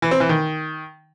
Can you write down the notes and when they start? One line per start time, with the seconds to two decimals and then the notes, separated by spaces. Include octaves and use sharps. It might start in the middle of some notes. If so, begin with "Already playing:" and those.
0.02 E3
0.11 C4
0.20 E3
0.29 D#3